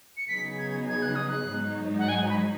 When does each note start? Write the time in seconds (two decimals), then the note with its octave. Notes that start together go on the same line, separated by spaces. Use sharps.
0.17 C#7
0.28 C#3 F#3 B3 D#4 G#4 B6
0.58 G#6
0.88 G#6
1.02 F#6
1.16 D#6
1.29 F#6
1.49 G#2 F#3 D#4
1.98 F#5
2.09 G#5
2.24 G#5
2.29 B5